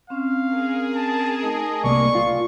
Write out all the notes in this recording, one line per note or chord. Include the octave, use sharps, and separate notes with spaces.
C4 C#4 F5
G#4 A#4
A5
A3 D#4 D#5 A5
C2 A#3 D5 C#6
F4